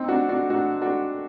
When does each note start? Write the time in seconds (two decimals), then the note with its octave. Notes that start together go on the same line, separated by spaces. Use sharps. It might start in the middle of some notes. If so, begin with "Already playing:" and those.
Already playing: C4 D#4
0.08 D4 F#4
0.29 D4 F#4
0.50 D4 F#4
0.82 D4 F#4